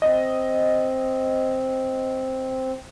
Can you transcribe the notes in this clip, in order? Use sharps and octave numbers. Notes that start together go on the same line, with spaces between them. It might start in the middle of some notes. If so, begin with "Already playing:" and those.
C4 D#5